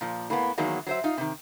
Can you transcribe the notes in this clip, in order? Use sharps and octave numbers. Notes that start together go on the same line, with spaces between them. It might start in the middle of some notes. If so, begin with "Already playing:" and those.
A#2 F3
A2 A#3 B3
E2 D#3 F#3 G#3 A#3
F#3 C5 E5
D#4 F4
C3 D#3